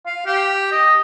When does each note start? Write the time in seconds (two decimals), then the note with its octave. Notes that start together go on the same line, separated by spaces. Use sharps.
0.06 F5
0.26 G4
0.72 D#5